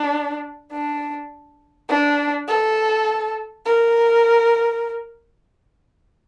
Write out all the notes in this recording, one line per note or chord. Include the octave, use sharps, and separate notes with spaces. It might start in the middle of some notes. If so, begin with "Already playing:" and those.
Already playing: D4
D4
D4
A4
A#4